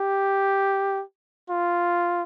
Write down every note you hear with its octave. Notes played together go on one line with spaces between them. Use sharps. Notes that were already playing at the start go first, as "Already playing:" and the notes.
Already playing: G4
F4